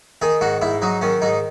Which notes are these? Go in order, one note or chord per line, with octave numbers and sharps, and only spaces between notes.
D#3 G#4
G#2 F#4
G#2 E4
F#3 D#4
D#3 C#4
G#2 D#4